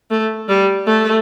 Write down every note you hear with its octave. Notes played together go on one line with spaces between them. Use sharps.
A3
G3
A3